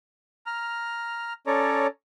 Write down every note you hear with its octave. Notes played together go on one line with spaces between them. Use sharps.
A#5 F6
C#4 A4 C#5 D5 A#5